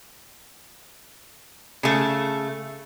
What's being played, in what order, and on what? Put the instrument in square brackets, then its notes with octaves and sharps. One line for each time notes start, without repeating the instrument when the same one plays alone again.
[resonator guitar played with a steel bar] C#3 A3